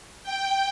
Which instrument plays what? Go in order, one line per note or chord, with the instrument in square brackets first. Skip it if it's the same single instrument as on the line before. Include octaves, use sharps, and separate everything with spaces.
[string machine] G5